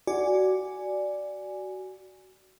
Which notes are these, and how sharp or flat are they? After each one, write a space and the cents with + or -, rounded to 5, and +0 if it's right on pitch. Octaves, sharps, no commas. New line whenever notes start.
F#4 +20 D5 +0 G#5 +0